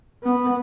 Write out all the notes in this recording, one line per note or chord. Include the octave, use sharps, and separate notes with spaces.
B3